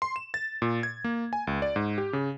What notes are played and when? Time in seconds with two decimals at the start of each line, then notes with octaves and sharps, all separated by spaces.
0.02 C6
0.16 E7
0.34 A6
0.62 A#2
0.83 G#6
1.04 A#3
1.33 G#5
1.47 C#2
1.62 D5
1.76 G#2
1.98 G4
2.13 C#3